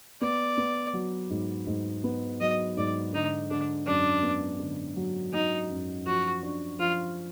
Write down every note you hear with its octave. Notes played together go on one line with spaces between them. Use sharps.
B3 D5
B3
F#3
G#2
G#2
B3
F#3 D#5
G#2 D5
D3 D#4
D3 D4
F#2 D4
B3
D3
F#3
F#3 D#4
F#2
F3 F#4
D4
F3 F4